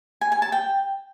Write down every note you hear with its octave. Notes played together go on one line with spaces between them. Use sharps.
G#5
G#5
A5
G5